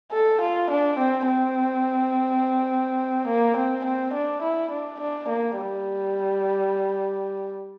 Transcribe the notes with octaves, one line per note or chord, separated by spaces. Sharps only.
A4
F4
D4
C4
C4
A#3
C4
C4
D4
E4
D4
D4
A#3
G3